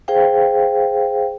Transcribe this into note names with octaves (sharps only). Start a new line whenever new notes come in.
G#4 C5 F5 G5